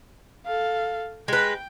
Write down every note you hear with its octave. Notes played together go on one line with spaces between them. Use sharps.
A4 F5
G#3 B4 G5